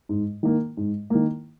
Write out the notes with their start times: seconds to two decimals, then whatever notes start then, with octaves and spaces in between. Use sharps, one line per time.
0.09 G#2
0.43 D#3 A#3
0.77 G#2
1.10 D#3 A#3